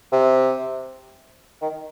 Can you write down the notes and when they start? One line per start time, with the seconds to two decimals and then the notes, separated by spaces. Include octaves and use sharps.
0.12 C3
1.62 D#3